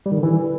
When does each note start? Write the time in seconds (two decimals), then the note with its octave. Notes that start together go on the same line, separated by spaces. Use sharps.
0.06 G3
0.12 D#3
0.17 D3
0.23 E3